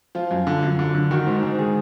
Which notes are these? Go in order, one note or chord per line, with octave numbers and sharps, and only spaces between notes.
F3 F4
F#2
D3
F#2
D3
D3
D#3 F#4
G#2
G#2
D#3 G#4